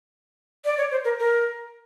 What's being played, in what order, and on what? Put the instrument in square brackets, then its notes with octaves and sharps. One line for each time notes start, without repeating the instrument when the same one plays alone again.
[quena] D5
C#5
C5
A#4
A#4